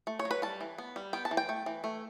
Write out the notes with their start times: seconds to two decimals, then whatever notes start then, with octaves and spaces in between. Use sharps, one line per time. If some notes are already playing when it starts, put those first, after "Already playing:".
0.07 A3
0.19 C#5
0.25 F#3
0.31 B4
0.42 G3 A5
0.61 E3
0.78 B3
0.96 G3
1.13 B3 G5
1.25 A5
1.31 E3
1.37 G5
1.49 A3
1.66 E3
1.84 A3